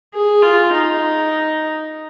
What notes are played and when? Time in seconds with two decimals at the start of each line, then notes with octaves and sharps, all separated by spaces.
0.14 G#4
0.43 F4
0.73 D#4